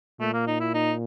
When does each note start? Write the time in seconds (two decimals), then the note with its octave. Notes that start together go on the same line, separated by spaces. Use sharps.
0.20 A#2 A3
0.33 A#3
0.47 D#4
0.60 E4
0.74 D#4